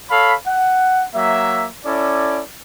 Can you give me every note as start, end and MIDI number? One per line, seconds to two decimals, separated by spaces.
0.10 0.34 69
0.10 0.34 73
0.10 0.34 77
0.10 0.34 83
0.47 1.05 78
1.15 1.67 54
1.15 1.67 58
1.15 1.67 76
1.85 2.42 61
1.85 2.42 64
1.85 2.42 69
1.85 2.42 74